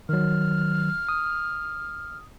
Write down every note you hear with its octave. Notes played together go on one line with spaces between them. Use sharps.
D#3 F#3 F6
D#6